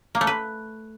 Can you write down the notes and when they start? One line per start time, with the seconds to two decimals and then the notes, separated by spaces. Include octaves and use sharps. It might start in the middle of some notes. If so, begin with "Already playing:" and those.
0.15 A#3
0.21 A3
0.27 B4